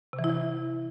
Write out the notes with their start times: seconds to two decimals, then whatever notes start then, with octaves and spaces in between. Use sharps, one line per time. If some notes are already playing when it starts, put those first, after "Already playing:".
0.13 C3
0.19 E3
0.24 E4
0.29 E3